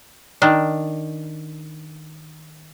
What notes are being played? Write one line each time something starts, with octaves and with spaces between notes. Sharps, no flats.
D#3 D4